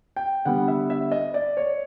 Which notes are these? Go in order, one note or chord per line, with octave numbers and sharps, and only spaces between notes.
G5
D3 G3 B3 F#5
E5
E5
D#5
D5
C#5